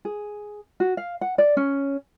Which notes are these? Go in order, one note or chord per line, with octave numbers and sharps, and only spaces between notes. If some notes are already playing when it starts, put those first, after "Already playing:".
G#4
F#4
F5
F#5
D5
C#4